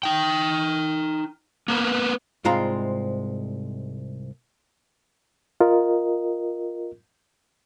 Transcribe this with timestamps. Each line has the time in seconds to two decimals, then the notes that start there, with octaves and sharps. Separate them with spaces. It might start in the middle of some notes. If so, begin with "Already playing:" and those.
0.03 D#4 G5
1.68 A#3 B3 A#4 B4
2.45 C2 G#2 G#3 C4 F4 A#5
5.61 F4 A#4 D#5